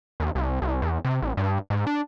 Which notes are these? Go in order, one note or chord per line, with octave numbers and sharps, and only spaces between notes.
D#2
C2
C2
E2
C3
A1
G2
G#2
D4